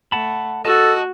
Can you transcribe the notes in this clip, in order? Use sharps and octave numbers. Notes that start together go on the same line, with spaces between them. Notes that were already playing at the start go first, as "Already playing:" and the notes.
A3 F#5 A5 B5
F#4 A4 D#5 A5